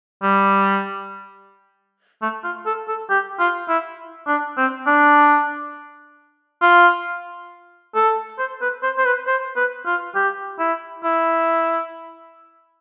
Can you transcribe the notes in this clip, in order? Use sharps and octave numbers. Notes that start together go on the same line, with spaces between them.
G3
A3
F4
A4
A4
G4
F4
E4
D4
C4
D4
F4
A4
C5
B4
C5
C5
B4
C5
B4
F4
G4
E4
E4